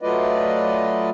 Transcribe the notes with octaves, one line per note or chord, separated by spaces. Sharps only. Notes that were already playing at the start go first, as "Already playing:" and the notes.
F#3 A3 F4 B4 D5 D#5